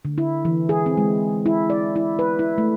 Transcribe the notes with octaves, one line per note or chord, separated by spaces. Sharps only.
D3
E4
E3
G#4
C4
G#3
E4
D5
E4
B4
E4
A3